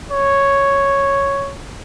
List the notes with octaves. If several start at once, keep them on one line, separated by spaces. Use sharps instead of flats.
C#5